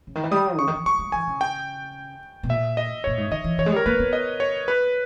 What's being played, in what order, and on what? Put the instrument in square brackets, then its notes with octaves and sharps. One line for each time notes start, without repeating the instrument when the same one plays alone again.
[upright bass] C#3
D#3
E3
[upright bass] G3 [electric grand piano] D#6
[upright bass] C#3 [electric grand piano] C#6
[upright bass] D#3
E3
[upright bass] G3 [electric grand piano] C#6
[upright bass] G3
[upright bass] E3 [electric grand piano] G#5
[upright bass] C#3
[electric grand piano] G5
[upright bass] B2
[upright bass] A#2 [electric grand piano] E5
[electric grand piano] D#5
[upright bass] A#2 [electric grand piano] C#5
[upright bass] G#2
[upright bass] D#3 [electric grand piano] D#5
[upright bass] E3
[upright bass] E3 [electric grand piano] C#5
[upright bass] G#3
[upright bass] G3 [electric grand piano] A#4
[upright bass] A#3 [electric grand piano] B4
[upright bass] B3
[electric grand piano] D#5
C#5
B4